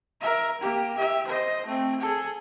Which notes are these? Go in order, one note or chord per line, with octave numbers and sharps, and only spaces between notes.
A#4 E5
A#3 G4
G4 E5
C5 D#5
A3 C4
G#4 A4